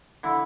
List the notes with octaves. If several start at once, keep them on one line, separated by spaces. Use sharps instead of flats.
D3 E4